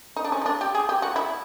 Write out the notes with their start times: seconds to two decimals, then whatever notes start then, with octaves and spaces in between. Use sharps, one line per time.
0.16 D#4
0.24 D4
0.32 C#4
0.42 D#4
0.46 D4
0.61 G4
0.75 G#4
0.89 G4
1.02 F#4
1.16 E4